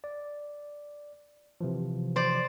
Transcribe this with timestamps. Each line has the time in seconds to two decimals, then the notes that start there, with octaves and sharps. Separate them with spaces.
0.04 D5
1.61 C3 E3 F3
2.16 C5 D5